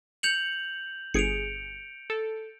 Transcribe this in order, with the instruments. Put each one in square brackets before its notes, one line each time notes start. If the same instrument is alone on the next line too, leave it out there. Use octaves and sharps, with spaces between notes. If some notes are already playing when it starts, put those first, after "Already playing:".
[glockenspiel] G6 F7 F#7 [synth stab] C#7
[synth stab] G1 G#4 [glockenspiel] C#7 D7 F7
[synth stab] A4